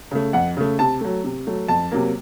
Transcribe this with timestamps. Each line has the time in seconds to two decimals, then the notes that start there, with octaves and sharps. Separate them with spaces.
0.11 C#3 A3
0.33 F2 F#5
0.57 C#3 A3
0.79 C3 A5
1.01 F#3 A3
1.24 C3
1.47 F#3 A3
1.68 F2 A5
1.91 C3 F#3 A#3